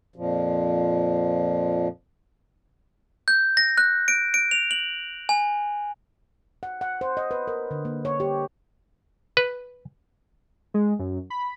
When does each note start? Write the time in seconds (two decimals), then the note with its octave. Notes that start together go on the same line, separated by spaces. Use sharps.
0.16 F2 A#2 F3
3.28 G6
3.57 A#6
3.78 F#6
4.08 D7
4.34 D7
4.51 F7
4.71 F#7
5.29 G#5
6.63 F#5
6.81 F#5
7.01 C5
7.17 D#5
7.31 B4
7.48 A#4
7.71 D3
7.85 A#3
8.05 C#5
8.20 G4
9.37 B4
10.74 G#3
10.99 F#2
11.30 B5